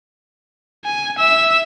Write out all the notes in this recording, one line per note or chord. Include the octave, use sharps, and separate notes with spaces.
G#5
E5 E6